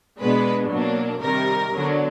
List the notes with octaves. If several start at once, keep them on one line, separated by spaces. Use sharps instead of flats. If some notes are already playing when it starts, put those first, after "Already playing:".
B2 G#3 B3 D4 B4
B2 F#3 A#3 D4
C3 D#3 G3 A#4
D3 F#3 B3 D4